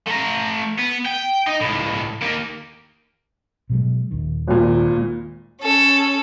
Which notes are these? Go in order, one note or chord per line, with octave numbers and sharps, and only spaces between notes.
A3 A#5
B3
G5
D#4
C#2 A2
A#3 D#4
B2 F#3 G#3
D#1 D#2 D#3
G#1 A#2
C#4 A4